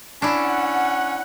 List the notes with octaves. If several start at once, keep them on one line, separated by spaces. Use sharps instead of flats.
C#4 D4 E4 F#5